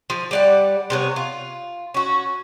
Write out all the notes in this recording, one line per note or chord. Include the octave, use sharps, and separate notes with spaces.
F3
G3 D5 F#5
C3 B3 C#5
F4
C#4 F#4